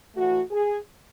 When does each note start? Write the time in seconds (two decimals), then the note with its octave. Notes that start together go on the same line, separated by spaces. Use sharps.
0.15 A2 E3 A3 F#4
0.51 G#4